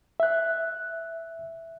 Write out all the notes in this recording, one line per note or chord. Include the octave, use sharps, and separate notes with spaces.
E5 F#6